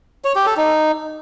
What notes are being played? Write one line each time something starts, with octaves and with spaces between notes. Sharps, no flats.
C#5
G4
A4
D#4